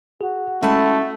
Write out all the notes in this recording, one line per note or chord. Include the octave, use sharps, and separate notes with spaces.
F#4 G#4
G#3 A3 C#4 E4 A5